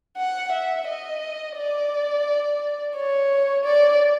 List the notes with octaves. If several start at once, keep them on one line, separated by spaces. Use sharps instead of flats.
F#5
E5
D#5
D5
C#5
D5